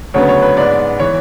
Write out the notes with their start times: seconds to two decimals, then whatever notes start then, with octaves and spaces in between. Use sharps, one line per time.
0.14 D2 C#3 F#3 B3 C#5
0.29 C#5
0.42 B4
0.57 G#2 G#3 B3 D5
1.00 E3 B3 C#5